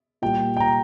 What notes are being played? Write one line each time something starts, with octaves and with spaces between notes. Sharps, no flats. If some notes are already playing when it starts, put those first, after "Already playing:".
A#2 G3 G5
G5
A#5